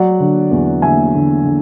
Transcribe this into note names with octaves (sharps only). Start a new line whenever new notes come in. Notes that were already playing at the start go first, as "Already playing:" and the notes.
Already playing: F#3 D5 F#5
D3
E2
D3 E5 G#5
D3
D3